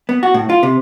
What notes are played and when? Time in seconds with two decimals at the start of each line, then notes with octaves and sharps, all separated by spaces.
0.09 B3
0.23 F#4
0.34 A2
0.50 F4
0.63 C3